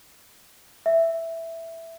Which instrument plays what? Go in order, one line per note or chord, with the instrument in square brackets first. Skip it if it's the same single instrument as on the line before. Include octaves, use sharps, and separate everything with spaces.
[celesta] E5